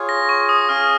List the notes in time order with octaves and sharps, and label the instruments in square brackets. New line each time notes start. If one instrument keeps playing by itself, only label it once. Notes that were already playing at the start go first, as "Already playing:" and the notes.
Already playing: [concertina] F4 G#4 C#5
[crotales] A#6
C#6
D#6
[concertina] C#4 G#4 F5 G#5 [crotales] F6